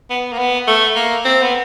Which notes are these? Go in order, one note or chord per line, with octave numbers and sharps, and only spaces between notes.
B3
A#3
B3
A3
A#3
C4
B3